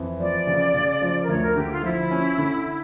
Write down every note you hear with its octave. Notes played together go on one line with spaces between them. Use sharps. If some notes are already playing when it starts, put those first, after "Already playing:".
Already playing: F2 E3
F3 D5
C#3
C#3
F3
A#4
D2 C#5
A#4
D3 G4
F4
F3 E4
C#4
D3